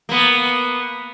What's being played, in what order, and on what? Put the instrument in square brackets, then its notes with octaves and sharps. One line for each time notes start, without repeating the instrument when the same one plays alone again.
[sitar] A#3 B3